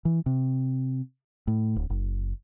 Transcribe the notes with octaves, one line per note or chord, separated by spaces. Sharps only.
E3
C3
A2
D1
F#1